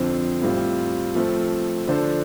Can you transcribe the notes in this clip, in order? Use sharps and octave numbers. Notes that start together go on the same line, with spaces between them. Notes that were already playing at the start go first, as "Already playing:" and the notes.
Already playing: F2 D3 F3 C4
A2 G3 C4 F4
F3 A3 C4
D3 F3 D4 A4 C5